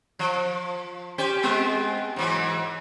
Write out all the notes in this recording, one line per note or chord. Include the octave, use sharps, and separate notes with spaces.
F3
C#4 G4 C5
G#3 B3 C4
G#2 E3 F#3